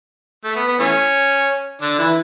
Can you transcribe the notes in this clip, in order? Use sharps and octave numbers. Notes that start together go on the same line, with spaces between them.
A3
B3
B3
E3 A3 C#4
D3 D4
E3 E4